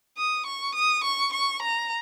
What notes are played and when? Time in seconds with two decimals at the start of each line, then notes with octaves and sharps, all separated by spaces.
0.17 D#6
0.46 C#6
0.75 D#6
1.04 C#6
1.33 C#6
1.62 A#5